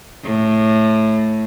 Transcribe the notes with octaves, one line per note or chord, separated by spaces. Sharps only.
A2